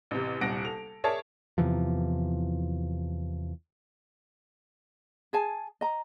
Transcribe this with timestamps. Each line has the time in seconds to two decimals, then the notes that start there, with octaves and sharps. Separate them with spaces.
0.11 A1 C3
0.41 D#1 C2 F#5 A#6 D7
0.65 A4 F7
1.04 G#4 A#4 C#5 D5 E5 A5
1.58 E2 C3 E3 F3
5.33 G#4 G#5 A5
5.81 D#5 A#5